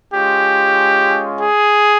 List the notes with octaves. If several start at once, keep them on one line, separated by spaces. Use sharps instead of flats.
G#3 C#4 F4 G4
G#4